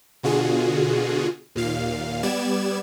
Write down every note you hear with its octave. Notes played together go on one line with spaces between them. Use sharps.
B2 D3 F4 F#4 G#4
D#2 A#2 F5
G3 B3 D5 G#6 E7